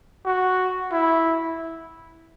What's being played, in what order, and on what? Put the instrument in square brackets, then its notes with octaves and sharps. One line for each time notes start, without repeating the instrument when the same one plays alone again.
[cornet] F#4
E4